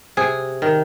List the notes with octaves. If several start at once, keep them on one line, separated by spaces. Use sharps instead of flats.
C3 G#4
D#3